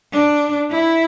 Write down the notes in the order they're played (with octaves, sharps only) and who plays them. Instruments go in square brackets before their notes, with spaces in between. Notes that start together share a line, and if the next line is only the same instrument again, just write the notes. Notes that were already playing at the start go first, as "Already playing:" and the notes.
[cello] D4
E4